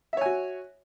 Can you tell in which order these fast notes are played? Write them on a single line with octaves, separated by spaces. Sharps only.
E5 C#5 G#5 F#4